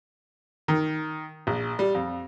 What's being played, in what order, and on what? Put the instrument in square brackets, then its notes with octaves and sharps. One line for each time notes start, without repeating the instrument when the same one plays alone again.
[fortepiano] D#3
A#1
G3
F2